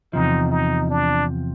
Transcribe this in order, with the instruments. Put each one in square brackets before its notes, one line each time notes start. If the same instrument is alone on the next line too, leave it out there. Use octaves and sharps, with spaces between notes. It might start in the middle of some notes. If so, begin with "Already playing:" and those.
[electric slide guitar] E2 C3 F3 [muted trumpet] D#4
[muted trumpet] D#4
D4